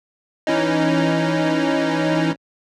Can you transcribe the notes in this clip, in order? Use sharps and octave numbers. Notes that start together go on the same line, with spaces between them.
E3 C#4 D#4